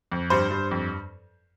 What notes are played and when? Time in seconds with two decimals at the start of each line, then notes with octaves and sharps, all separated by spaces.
0.12 F2
0.30 G2 C5
0.50 G2
0.71 F2